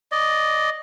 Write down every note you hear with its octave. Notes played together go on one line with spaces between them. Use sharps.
D5 D#5